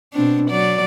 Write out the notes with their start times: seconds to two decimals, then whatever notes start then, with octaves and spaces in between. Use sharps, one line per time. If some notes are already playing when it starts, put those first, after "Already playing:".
0.13 B2 C4 D4
0.49 F#3 D5